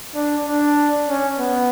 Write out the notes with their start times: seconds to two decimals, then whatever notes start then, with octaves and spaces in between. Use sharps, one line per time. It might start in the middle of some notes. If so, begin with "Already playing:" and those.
0.14 D4
0.46 D4
1.08 C#4
1.39 B3